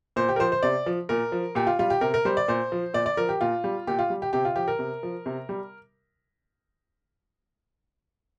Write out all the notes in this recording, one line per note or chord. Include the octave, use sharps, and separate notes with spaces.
A#2 C5
G4
A#4
F3 C5
C5
C3 D5
F3
A#2 A#4
F3
A#2 G4
F4
G3 F4
G4
C3 A#4
A#4
G3 C5
D5
A#2 C5
F3
A#2 D5
D5
F3 A#4
G4
A#2 F4
G3
A#2 G4
F4
G3
G4
C3 G4
F4
F3 G4
A#4
C3
F3
C3
G3